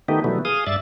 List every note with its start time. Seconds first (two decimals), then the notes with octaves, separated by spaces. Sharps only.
0.08 D#3 A3 B3 D#4 G4
0.24 B2 E3 F#3 G3 A3 B3
0.45 G#4 F5 D#6
0.67 G2 D5 E5 A6